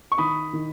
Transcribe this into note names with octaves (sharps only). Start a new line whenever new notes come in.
C#6
D#3 B5 D#6
D#3